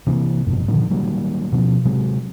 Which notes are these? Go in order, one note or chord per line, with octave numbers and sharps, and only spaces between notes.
C3 E3 F3 A#3
F1 G2 B2
A#2 D3 D#3 F3
D#3 F#3 G3 A#3
B2 F3 C#4
C3 F#3 G#3